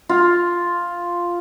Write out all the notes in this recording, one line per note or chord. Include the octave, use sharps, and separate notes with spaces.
F4